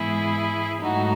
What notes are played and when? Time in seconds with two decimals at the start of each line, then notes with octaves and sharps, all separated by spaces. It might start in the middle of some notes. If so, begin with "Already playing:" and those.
Already playing: G#2 E3 G#3 B3 E4 G#4
0.82 G#2 F#3 A3 D#4 F#4